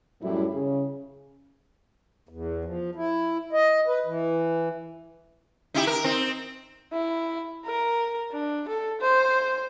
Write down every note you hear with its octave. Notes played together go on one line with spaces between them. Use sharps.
F#2 A2 F#3 G3 E4
C#3
E2
F3
E4
D#5
B4
E3
D#4 E4 G4
A#4
C4 D#4
E4
A#4
D4
A4
C5